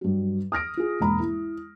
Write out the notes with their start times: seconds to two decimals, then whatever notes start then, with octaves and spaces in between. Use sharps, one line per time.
0.01 G2 F#3
0.52 D#6 F6 A#6 D7
0.77 F4 G#4
1.00 E1 G#2 A#3 A#5 B5
1.20 E4